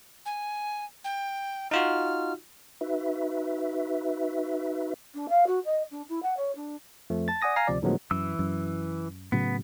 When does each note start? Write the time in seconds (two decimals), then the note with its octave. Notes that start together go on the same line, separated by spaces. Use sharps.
0.26 G#5
1.04 G5
1.71 D#4 F4 F#4 F6
2.81 D#4 F#4 B4 E5
5.14 D4
5.29 F5
5.47 F#4
5.65 D#5
5.91 D4
6.09 E4
6.23 F#5
6.37 C#5
6.56 D4
7.10 F2 F3 A3
7.28 A5 A6
7.42 D5 F#5 G#5 D#6 A#6
7.56 F5 G#5 A#5 A#6 C7
7.68 D2 C3 F3 D5
7.82 A2 D3 F3 F#3 G#3 B3
8.11 F#2 E3 E6
8.39 F#2
9.32 A2 C#3 F#3 B3